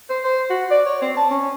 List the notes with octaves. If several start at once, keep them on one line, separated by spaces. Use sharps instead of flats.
C5
C5
F#4
D5
C#5
C4
A5
C#4